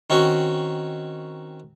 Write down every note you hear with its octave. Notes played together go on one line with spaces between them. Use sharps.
D#3 C4 C#4 F#4